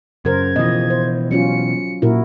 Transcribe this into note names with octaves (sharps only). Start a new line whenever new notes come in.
F#2 C#3 A#4 C5 G#6
B2 E3 F3 D#5
C5
F#3 C#4 F4 C#7
A#2 E4 F#4 A#4